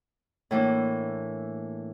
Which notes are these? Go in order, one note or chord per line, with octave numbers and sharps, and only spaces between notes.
A2 E3 A#3 D4